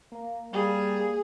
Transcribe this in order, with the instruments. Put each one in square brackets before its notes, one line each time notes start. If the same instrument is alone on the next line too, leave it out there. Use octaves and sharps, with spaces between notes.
[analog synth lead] A#3
[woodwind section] G3 [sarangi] G#4